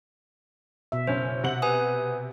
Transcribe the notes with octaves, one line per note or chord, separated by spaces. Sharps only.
B2 E5
F#1 C#4 C5 C#5
C3 F#5 F#7
B4 G#5 D#6